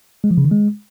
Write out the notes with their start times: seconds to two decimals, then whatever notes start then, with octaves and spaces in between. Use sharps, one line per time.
0.24 G#3
0.31 F3
0.38 C#3
0.45 D#3
0.51 G#3